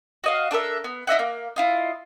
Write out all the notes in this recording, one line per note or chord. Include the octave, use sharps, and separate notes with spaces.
F#4 D#5 F5
D4 A4 A#4 E5
B3
E4 D#5 E5 F#5
A#3
E4 F4 D#5